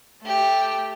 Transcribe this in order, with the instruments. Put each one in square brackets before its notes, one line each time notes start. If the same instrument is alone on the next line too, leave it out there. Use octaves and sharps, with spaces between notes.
[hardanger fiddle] A3 G4